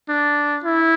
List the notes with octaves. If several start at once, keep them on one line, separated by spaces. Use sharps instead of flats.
D4
E4